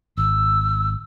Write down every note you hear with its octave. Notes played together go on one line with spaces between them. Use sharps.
G#1 E6